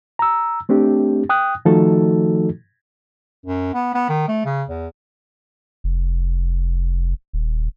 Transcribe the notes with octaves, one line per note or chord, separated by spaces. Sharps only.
A#5 E6
A3 C4 D4 G4
G5 D#6 F#6
D#3 F3 A3 D#4 F#4 A4
F#2
B3
B3
D#3
A3
C#3
E2
F1
D#1